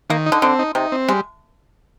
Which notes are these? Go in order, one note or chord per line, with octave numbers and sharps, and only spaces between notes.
D#3 A#3
D#4
D3
D3 C4
D#4
C3 D#4
C4
G3 G#3